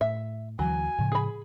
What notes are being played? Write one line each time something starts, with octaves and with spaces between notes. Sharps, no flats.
A2 E5
D2 E3 F#3 G#5
A2 C#3 F3
G#4 B5